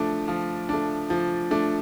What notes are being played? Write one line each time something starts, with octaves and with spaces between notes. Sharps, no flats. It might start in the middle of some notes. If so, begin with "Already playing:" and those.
Already playing: F3 A3 D4
F3
A3 D4
F3
A3 D4